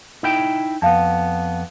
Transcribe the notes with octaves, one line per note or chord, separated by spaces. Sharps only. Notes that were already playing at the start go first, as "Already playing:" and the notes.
D#4 E4 G5
F2 B3 F5 A5